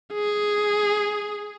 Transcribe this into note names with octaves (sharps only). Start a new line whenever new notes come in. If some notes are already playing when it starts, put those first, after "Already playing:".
G#4